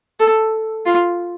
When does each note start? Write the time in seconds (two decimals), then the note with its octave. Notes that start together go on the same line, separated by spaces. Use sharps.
0.20 A4
0.86 F4